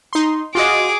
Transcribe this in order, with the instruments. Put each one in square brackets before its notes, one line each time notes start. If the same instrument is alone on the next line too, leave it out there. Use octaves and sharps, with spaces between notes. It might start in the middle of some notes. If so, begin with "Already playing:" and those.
[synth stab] D#4 C6
[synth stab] F4 F#4 D#5 [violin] G#4 D6